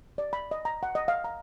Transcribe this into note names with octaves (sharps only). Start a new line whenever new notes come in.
D5
B5
D#5
A#5
F#5
D#5
F5
A#5